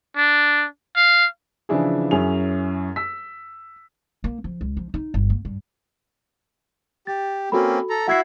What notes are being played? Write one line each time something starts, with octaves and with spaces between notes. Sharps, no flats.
D4
F5
C#3 E3 F3 D4 E4 G#4
F#2 C#4 E4 G#4 F7
E6 B6
A#3
F3
C#2
F3
D#4
G1
A#3
G2
G4 A6
A#3 C4 C#4 F#4 A4 B5
A4 A#5
E4 F#4 E5 F#5 G#6 C7